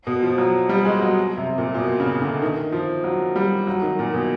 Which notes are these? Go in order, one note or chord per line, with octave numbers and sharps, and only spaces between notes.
B2
F3
F#3
G3
G#3
F#3
C3
A#2
A#2
B2
C#3
D3
D#3
F3
F#3
G3
F#3
D#3
A#2
B2